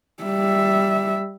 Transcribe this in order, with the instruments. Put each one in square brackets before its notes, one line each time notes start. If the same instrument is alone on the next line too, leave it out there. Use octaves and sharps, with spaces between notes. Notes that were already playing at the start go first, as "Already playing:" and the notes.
[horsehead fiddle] G3 E5